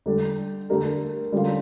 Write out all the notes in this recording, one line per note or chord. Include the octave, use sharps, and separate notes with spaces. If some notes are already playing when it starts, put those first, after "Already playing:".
D3 G3 D4 A4
D3 A3 D4 G4 A#4
D3 G3 C#4 F4